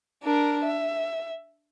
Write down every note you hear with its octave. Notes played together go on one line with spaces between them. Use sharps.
D4 A#4
E5